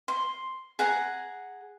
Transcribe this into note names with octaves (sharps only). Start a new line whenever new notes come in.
C6
G#4 F#5 A#5